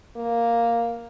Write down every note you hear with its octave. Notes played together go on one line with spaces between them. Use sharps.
A#3